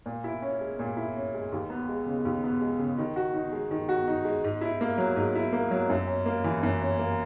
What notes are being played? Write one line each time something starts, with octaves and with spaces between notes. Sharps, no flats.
A#2
E4
C#4
G#3
A#2
E4
C#4
G#3
D#2
B3
G#3
C#3
D#2
B3
G#3
C#3
D#3
F#4
D#4
G#3
D#3
F#4
D#4
G#3
G#2
E4
A#3
F#3
G#2
E4
A#3
F#3
F#2
C#4
A#3
E3
F#2
C#4
A#3